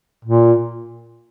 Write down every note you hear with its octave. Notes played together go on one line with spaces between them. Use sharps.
A#2